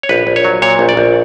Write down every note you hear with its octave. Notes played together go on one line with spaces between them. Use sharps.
C#5
A#1 B4
A#1
C#5
F#3
A#2 C#5
A#1
D5
A#1